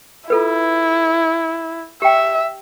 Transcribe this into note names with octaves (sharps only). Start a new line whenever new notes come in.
E4 F4 A4 B4
G4 E5 G5